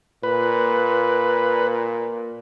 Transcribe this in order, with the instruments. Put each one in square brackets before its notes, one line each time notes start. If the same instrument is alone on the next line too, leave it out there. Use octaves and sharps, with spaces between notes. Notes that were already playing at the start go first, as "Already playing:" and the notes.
[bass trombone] A#2 [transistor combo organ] B4